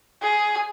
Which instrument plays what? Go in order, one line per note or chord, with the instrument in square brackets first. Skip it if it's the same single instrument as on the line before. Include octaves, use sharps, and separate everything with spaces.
[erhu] G#4